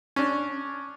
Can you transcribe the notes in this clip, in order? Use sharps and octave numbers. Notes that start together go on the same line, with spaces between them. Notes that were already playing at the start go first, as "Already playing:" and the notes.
C#4 D4